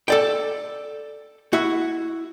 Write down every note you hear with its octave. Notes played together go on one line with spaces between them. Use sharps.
A4 D5 G5
E4 F#4